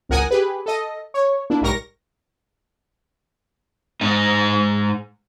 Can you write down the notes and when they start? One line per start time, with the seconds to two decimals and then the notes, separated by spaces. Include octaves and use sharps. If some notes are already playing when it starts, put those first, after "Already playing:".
0.09 G#1 C#2 A#4 F#5 G#5 D#6
0.31 G4 G#4 B4
0.66 A4 D#5
1.14 C#5
1.50 A#3 D4 E4
1.61 B1 G#2 G3 A#4 C#6 A#6
4.01 G#2 D#4